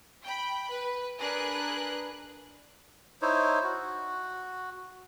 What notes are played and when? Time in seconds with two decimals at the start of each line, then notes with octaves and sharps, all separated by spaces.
0.23 G5 B5
0.71 B4
1.19 D4 G#4 A#4 B4 F#6
3.22 D#4 E4 C5 C#5
3.64 F#4